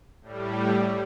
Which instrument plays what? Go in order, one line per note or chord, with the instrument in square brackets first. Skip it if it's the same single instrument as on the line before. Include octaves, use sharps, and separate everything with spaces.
[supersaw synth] A2 G3